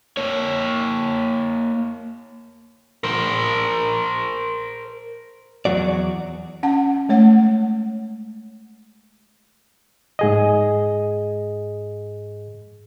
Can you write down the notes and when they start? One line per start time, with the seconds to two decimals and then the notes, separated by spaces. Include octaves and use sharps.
0.17 A#3 C#5
3.04 A#4 C5
5.65 E2 C#3 F#3 F#4 D5
6.63 C#4 F#5 A5
7.09 G#3 A3 C#5 F#5
10.19 G#2 G#4 D#5